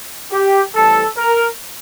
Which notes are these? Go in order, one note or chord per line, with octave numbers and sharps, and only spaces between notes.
G4
A2 E3 G3 C4 A4
A#4